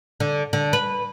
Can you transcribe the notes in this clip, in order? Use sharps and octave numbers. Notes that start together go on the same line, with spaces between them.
D3
D3
B4